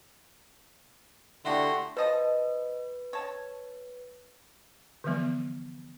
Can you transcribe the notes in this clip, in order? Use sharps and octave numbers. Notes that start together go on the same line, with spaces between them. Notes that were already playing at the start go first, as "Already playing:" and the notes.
D3 A3 E4 F#4 G4 C6
F3 B4 D#5 A5
C#5 A5
D3 E3 F3 G3 B3